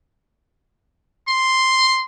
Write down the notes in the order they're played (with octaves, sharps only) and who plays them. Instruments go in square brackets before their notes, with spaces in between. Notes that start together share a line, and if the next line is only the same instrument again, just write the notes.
[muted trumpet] C6